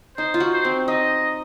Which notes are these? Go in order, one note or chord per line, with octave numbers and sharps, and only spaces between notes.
D#4 C5
F4
F#4
C5
C4
D#4 D#5